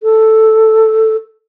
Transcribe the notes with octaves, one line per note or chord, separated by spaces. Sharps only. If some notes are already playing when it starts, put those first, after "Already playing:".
A4